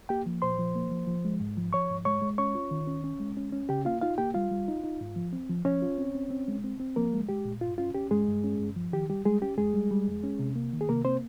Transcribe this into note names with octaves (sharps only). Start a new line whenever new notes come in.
A#3 G4 G5
F3
A#2 C5 C6
F3
A#3
F3
F3
G#3
G#2
F3
F3 C#5 C#6
G#2
G#3 C#5 C#6
G#3
C#4 C#5 C#6
F4
D#3
C#4
C#4
G#3
C#4
C#4
C#3 G4 G5
A#3 F4 F5
D#4 F4 F5
A#3 G4 G5
G3 F4 F5
G3
D#4
D#4
G#2
F3
C4
F3
F3 C#4 C#5
F4
C4
C4
C4
G#3
C4
C4
F3 A#3 A#4
G#3
G#3 G4
A#2
G2 F4
C#4 F4
C#4 G4
G2 G#3 G#4
G2
C#4
G2
F3
D#3 G4
G3 G4
G3 G#3 G#4
C#4 G4
F2 G#3 G#4
G3
G3
F2
C#4
C3
A#3
D#3
G#4
C3 A#3 A#4
A#3 C4 C5